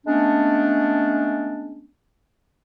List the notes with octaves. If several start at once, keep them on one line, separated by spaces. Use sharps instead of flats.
G#3 A3 B3 C#4 D4